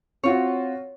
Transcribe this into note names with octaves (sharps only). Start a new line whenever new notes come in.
C4 F4 F#4 C#5